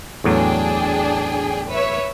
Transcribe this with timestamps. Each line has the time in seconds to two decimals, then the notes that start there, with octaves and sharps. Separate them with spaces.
0.24 E2 A2 F#3 D4 G#4 G5
1.68 B4 C#5 E5